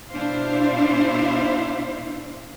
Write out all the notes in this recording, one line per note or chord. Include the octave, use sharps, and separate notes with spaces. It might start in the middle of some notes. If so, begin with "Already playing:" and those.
B2 D4 E4 C5 F5